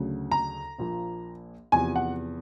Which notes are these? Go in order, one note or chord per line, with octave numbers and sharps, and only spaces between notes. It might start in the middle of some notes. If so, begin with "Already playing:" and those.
Already playing: D2 C#3 F#3
A#5
A#1 A#2 F3
E2 C3 F3 G#5
F#5